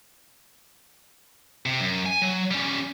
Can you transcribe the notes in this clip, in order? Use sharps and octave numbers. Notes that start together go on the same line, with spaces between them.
C3
F#2
G#5
F#3
G3 C#4